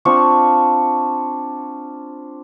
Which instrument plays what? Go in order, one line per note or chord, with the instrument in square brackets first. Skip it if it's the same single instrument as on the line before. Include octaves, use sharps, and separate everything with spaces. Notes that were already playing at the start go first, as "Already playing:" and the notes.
[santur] C4 D4 F4 C#6